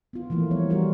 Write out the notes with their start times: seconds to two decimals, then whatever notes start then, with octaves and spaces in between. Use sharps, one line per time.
0.13 B3 F4
0.30 E3 F3 A3 A#3
0.51 G3 B3 C#5
0.70 E3 G3 A3 F4 F#4 A#4